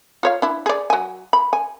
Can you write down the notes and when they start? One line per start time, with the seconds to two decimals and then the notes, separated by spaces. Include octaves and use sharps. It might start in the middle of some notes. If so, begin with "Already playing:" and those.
0.23 F4 C#5 F5
0.42 D4 E4
0.66 G#4 D5
0.90 F#3 G#5
1.33 B5
1.53 G#5